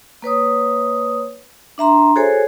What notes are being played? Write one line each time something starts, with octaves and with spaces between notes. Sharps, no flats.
A#3 B4 C#5 D#6
D4 E5 A#5 C6
F#4 G#4 A4 C5 C#5 G#5